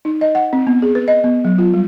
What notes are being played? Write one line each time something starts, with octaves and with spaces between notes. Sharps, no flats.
D#4
D#5
F#5
C4
B3
G#4
B4
D#5
B3
F#3
F4
G3